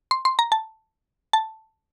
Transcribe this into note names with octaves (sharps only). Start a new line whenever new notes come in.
C6
C6
A#5
A5
A5